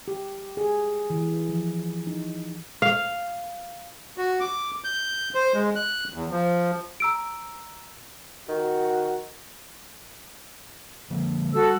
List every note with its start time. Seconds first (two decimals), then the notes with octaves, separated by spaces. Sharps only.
0.08 G4
0.57 G#4
1.10 E3
1.49 F3
2.07 D#4
2.82 F5
4.18 F#4
4.40 D6
4.84 G6
5.35 C5
5.54 G#3
5.75 F#6
6.14 E2
6.31 F3
7.00 A#5 E6 D7
8.49 D#3 F#4
11.10 D3 F3 A#3
11.54 G3 F#4 A4 E6